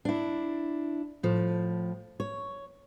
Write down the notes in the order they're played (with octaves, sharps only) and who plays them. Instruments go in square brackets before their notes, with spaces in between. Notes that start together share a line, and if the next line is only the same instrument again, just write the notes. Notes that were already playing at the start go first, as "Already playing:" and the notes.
[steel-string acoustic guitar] D4 E4
A2 F3
C#5